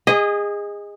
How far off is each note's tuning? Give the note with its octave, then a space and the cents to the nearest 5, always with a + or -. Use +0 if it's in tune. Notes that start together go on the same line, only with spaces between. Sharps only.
G#4 -25 D#5 +0